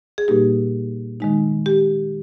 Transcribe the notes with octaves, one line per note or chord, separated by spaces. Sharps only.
G#4
A#2 G3 A#3 D#4 G4
D#3 G#3 D#4
G4